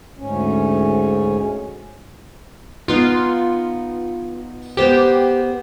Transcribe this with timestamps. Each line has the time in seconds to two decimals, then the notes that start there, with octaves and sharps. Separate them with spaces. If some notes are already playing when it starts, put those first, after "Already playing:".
0.18 D2 G#2 C#4
2.88 B3 D#4 F4
4.77 B3 G4 C5 G5